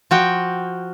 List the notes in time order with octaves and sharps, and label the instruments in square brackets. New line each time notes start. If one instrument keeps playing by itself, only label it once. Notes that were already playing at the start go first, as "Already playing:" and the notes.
[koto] F3 F#4 G5